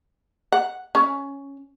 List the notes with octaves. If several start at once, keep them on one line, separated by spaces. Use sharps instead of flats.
F#5
C#4